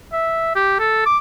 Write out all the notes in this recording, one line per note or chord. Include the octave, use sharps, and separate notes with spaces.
E5
G4
A4
D6